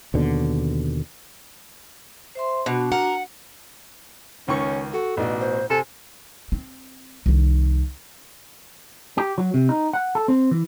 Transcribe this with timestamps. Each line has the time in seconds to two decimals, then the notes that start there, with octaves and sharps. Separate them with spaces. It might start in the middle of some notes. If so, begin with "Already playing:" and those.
0.14 D#2 B2 D3
2.35 C5 E5 C6
2.66 B2 D4 F#4
2.92 A#4 F#5
4.48 C#2 D#3 C#4 C#6
4.93 F#4 A4
5.17 A1 B2 D#4 D5
5.41 C5
5.70 C3 A4 G#5
6.52 C4
7.26 C2 D#3
9.18 G4
9.38 F#3
9.54 C3
9.69 D#4
9.93 F#5
10.15 A4
10.28 C4
10.51 E3